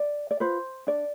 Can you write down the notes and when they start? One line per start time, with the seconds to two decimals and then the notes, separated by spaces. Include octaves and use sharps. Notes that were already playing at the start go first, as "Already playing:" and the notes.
Already playing: D5
0.31 D5
0.40 F4 B4 C5
0.87 D4 D5